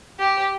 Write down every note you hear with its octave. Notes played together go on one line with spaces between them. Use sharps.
G4